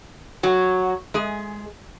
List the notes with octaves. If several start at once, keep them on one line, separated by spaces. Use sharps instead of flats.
F#3 F#4
G#3 G#4